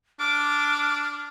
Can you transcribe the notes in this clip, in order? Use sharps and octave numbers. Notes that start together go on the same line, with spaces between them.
D4 D6 F6